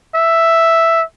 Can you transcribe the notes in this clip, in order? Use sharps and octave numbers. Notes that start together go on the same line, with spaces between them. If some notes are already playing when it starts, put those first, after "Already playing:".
E5